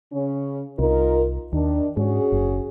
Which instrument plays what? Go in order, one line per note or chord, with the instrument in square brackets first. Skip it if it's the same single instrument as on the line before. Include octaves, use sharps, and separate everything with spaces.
[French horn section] C#3 C#4
[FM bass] C2 [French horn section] D#4 F4 A#4
[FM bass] D#2 [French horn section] D#3 D4
[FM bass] G#2 [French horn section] C#4 F#4 G#4
[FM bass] F#1